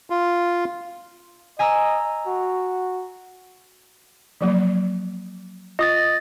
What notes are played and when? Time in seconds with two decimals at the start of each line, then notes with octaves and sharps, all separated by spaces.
0.10 F4
1.59 D#5 G#5 A#5 E6
2.27 F#4
4.41 F3 F#3 A#3
5.79 F4 D#5 D#6 A6